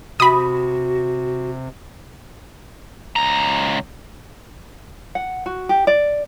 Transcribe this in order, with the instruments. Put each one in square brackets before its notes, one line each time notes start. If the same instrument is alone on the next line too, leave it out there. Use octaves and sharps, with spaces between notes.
[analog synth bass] C3 [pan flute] F#4 [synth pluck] B5 D#6
[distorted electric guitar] C#2 A#5
[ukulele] F#5
F#4
G4
D5